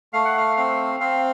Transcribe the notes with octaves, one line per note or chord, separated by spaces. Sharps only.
A3 F5
F#5
F5
C4 F5
C4 F5